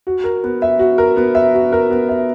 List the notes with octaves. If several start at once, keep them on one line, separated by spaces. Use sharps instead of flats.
F#4
A#4
B3
E5
F#4
A#4
B3
E5
F#4
A#4
B3
E5